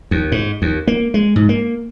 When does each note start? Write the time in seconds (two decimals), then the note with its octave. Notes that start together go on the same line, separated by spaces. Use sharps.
0.11 D#2
0.32 G#2
0.62 D#2
0.87 A#3
1.14 G#3
1.36 G#2
1.49 A#3